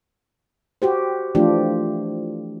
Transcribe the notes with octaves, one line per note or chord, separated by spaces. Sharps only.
F#4 G4 C5
E3 F3 A3 D4 F4 G4